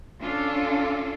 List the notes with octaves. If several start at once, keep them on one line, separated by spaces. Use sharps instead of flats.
C#4 D4 F4 A4